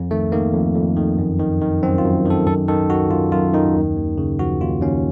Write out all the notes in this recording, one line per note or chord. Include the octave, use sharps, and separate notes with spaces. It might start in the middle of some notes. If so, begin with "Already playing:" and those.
Already playing: F2
D#3 A3
D#3 A#3
F2
F2
D#3
F#2
D#3
D#3
F#2 C4
F4
F#2
D#3
A4
F#2 A4
D#3 A4
D#3 F#4
F#2 F4
F#2 F4
D#3 D#4
D#2
D#2
C#3
F3 F#4
D#2 F4
D#2 C#4